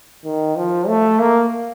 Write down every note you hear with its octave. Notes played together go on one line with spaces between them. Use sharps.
D#3
F3
A3
A#3